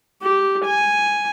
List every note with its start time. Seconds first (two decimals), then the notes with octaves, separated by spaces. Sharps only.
0.22 G4
0.65 G#5